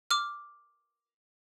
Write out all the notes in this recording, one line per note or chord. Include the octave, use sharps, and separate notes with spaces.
D6 F6